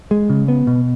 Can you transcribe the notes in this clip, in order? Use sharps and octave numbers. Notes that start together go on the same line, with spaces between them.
G#3
C#3
B3
B2